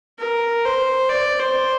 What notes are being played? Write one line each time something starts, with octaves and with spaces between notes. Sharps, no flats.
A#4
C5
D5
C5